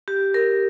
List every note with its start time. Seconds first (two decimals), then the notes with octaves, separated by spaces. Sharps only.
0.08 G4
0.34 A#4